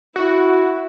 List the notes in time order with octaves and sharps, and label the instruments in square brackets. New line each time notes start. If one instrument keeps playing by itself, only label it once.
[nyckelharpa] E4 [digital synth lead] F#4